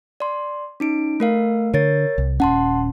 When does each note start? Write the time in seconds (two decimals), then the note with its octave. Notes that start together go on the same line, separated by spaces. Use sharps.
0.20 D5 C6
0.80 C#4 D#4 D7
1.20 A3 A#4 F5
1.74 D3 A#4 C#5 A6
2.18 C2
2.40 D#1 C#4 F#5 A5 C6